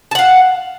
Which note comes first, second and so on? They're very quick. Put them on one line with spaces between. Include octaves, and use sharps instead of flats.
A5 F#5 F5